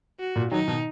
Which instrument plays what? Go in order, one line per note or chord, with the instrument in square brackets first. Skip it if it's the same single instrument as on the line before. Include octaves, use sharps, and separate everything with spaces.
[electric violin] F#4
[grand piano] A#2
[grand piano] D#3 F#3 [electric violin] D#4
[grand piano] B2 D#3